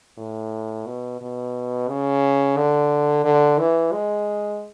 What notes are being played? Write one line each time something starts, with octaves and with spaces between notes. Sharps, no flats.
A2
B2
B2
C#3
D3
D3
E3
G#3